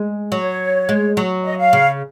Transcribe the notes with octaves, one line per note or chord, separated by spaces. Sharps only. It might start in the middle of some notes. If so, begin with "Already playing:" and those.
Already playing: G#3
F#3 C#5
G#3
F#3
D#5
F5
C#3